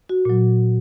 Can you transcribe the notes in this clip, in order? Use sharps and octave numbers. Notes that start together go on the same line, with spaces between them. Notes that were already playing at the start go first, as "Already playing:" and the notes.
F#4
A#2 F#3